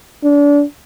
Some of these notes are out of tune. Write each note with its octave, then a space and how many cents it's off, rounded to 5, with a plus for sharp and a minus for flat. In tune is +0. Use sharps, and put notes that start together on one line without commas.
D4 -30